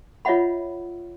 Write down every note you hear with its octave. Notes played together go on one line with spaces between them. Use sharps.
F4 C#5 D#5 E5 F#5 B5